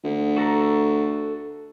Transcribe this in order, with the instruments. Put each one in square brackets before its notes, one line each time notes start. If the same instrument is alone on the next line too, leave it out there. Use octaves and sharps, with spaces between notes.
[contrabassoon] D2
[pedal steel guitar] F#4 A4 A#5